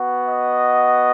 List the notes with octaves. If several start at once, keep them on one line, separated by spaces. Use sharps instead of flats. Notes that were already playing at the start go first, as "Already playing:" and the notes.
Already playing: B3 F#4
D#5